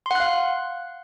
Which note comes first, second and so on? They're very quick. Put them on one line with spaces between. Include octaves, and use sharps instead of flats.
C6 F#5 F#6 F5